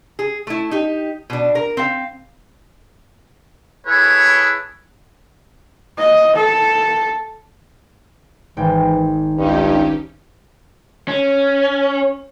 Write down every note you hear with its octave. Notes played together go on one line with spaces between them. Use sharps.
G#4
A3 E4
D#4 G4
B2 D4
A#4
C4 F5
E4 G#4 A4 B4 C#5
D#5
A4
G#1 E3 G5
C#2 G2 C#4 D#4 G4
C#4